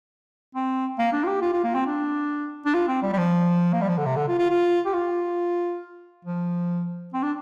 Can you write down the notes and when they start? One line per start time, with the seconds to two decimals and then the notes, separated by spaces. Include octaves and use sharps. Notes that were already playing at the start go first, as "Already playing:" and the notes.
0.55 C4
0.99 A#3
1.13 D4
1.23 F4
1.27 G4
1.41 F4
1.53 F4
1.64 A#3
1.75 C4
1.87 D4
2.65 D4
2.74 F4
2.88 C4
3.03 G3
3.13 G3
3.18 F3
3.73 A#3
3.81 G3
3.89 F3
3.98 D3
4.06 C3
4.16 D3
4.28 F4
4.38 F4
4.50 F4
4.86 G4
4.94 F4
6.25 F3
7.14 C4
7.22 D4